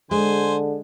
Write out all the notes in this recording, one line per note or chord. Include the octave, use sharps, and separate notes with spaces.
D3 G#3 C5 G#5